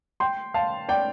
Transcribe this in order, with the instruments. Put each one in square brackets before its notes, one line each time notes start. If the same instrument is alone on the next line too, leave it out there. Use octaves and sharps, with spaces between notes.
[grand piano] G5 C6
F5 A5
D5 G5